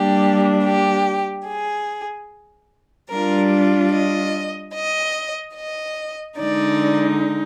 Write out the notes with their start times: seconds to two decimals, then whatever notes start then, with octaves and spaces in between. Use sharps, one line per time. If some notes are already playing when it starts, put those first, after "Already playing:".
Already playing: G3 A#3 D4 G4
0.65 G4
1.47 G#4
3.11 G3 D4 F4 A#4
3.93 D#5
4.75 D#5
5.56 D#5
6.38 D3 G#3 D#4 D5